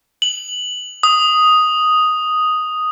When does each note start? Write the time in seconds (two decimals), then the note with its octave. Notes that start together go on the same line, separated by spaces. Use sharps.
0.22 F#7
1.03 D#6